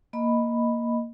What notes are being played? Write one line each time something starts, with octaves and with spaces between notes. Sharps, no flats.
A#3 D#5 B5